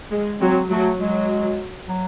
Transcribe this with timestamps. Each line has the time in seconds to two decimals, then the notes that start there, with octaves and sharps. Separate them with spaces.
0.11 G#3
0.41 F#3 C4
0.70 F#3 A3
0.99 F#3 G#3
1.89 F#3